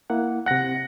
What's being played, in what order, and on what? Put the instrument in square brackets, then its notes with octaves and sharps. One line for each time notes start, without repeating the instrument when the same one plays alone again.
[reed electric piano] A#3 E4 F#5
[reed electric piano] C3 F#6 [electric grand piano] F#5 A#6